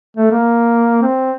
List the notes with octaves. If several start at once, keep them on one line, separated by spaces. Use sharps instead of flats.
A3
A#3
C4